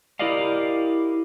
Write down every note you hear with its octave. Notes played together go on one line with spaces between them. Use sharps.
E4 G4 A#4 D5 D#5 F5